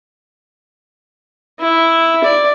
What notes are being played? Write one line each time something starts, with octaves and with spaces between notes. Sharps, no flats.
E4
D5